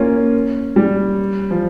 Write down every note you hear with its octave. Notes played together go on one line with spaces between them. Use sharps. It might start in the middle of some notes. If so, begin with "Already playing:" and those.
Already playing: A#3 C#4 F4
G3
F3